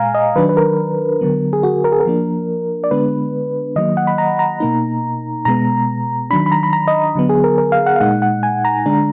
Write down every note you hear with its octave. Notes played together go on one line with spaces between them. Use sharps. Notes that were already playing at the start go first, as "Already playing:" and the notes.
Already playing: A#2 G#3 F5 G#5 A#5
D#5
D#3 F#3 D4 B4
B4
A#4
D3 F#3 B3
G#4
F#4
A#4
G#4
A#4
F3 A#3 D4
D5
D3 G#3 B3 D4 B4
D#3 F#3 A#3 D#5
F#5
B5
A#5
A#5
B2 A#3 D#4
B2 G#3 B3 A#5
D#3 F#3 D4 B5
B5
A#5
B5
A#5
D#5
D3 F#3 B3
G#4
A#4
A#4
F5
F#5
F5
A#2 G#3 D#4 F#5
F#5
G#5
A#5
D3 G#3 D4